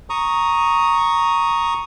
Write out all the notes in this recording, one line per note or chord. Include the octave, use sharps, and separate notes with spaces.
A#5 C#6 D#6